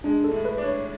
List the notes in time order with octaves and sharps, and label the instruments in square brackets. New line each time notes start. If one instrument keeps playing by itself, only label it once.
[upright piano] G#3 [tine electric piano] D4
[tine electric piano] A4
[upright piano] A2
[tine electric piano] B4
[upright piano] D4
[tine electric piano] C#5